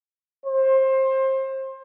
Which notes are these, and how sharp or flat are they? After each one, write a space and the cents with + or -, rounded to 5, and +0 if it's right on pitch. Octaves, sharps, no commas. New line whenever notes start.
C5 +25